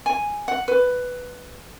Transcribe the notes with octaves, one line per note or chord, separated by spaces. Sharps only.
G#5
F#5
B4